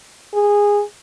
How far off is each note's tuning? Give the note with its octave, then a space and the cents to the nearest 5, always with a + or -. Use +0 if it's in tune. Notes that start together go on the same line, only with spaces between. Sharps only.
G#4 -15